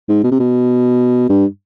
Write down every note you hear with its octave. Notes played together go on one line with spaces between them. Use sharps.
G#2
B2
C3
B2
G2